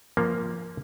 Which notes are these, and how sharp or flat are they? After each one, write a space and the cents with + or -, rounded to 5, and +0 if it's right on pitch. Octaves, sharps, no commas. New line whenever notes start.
F3 -10 A#3 +0